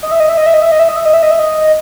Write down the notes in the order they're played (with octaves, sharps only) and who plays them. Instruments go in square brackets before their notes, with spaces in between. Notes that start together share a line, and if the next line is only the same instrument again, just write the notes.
[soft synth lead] D#5
E5
D#5
E5
D#5
E5
D#5
E5
D#5
E5
D#5
E5
D#5
E5
D#5
E5
D#5